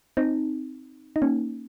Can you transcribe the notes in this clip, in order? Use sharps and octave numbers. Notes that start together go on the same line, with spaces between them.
C4 D#4
D#4
A#3 C#4